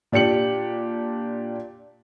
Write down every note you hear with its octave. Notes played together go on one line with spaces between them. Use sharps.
A#2 D4 G4 C#7 F#7